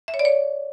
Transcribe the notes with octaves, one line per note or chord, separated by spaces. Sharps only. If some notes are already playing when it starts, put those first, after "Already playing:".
E5
C#5
D5
C#5